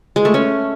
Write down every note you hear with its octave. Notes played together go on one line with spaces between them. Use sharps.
G#3
A3
C#4